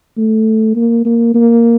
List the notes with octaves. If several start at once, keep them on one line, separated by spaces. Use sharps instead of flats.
A3
A#3
A#3
A#3